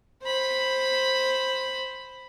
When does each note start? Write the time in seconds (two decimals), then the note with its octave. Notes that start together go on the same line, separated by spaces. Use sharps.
0.24 C5 B5